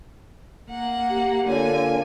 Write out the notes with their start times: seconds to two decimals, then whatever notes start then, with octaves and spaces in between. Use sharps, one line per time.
0.70 A#3 F#5
1.10 G4
1.48 D3 A#3 F4 A4 C#5 G#5